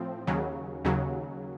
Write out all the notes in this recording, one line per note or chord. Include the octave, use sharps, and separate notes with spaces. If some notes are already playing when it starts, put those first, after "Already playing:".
Already playing: A2 F3 C4
D#2 C#3 F#3
D#2 C#3 F#3